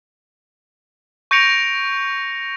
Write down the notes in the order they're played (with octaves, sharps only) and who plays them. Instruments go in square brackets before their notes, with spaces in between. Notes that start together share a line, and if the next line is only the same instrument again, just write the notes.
[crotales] C#6 G6 A#6 C#7 D7 F7